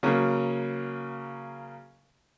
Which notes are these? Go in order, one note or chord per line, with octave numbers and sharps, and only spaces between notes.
C#3 F#3 A#3